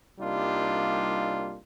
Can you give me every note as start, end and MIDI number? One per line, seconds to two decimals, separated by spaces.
0.19 1.58 36
0.19 1.58 55
0.19 1.58 58
0.19 1.58 62
0.19 1.58 63
0.19 1.58 65